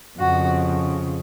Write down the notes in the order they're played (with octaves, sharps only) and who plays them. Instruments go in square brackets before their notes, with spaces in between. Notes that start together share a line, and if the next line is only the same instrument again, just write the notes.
[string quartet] F2 C#3 F#4